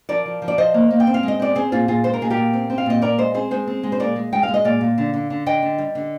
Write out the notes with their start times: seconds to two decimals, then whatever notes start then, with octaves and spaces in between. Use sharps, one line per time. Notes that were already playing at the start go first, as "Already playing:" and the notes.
0.09 F3 A#4 D5
0.25 F3
0.42 F3
0.48 D5
0.58 F3 C5 D#5
0.74 A#3
0.90 A#3
1.00 G5
1.07 C4
1.14 F5
1.23 G#3
1.28 D#5
1.40 C4 D5
1.55 C4 G#4 C5
1.72 A#2 F4 G#4
1.88 A#2 F4 G#4
2.04 G#3 C5
2.14 A#4
2.21 A#2 G#4
2.30 G4 A#4
2.37 A#2
2.53 C4
2.70 C4
2.78 F5
2.86 A#2 D#5
3.02 A#2 A#4 D5
3.18 G#3 C5 D#5
3.34 C4 G#4 C5
3.51 G#3 G#4 C5
3.67 C4
3.83 G#3
3.92 C5
4.00 A#2 A#4 D5
4.16 G#3
4.32 G#3 G5
4.43 F5
4.48 G#3
4.54 D#5
4.64 A#2 D5 F5
4.81 A#2
4.98 D3
5.14 D3
5.30 D3
5.46 D3 D#5 G5
5.63 D3
5.78 G3
5.95 D3